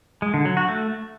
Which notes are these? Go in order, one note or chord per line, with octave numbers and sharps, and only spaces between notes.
G#3
D3
F#3
F#4
A3